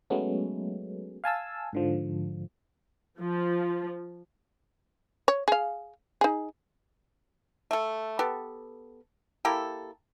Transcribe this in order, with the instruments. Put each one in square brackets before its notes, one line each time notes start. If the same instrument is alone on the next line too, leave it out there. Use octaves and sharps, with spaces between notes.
[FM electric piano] F#3 G#3 A3 B3 C#4
F5 G#5 A5 E6
G#2 D3 F3
[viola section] F3
[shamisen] C#5
G#4 F5
D#4 G#4
[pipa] A3 A4
B3 G4 A4
A#3 E4 G4 A4